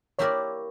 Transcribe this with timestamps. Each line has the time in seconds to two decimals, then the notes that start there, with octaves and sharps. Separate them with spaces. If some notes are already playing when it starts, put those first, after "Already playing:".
0.19 A#3 E4 G4 A#4 C#5 D5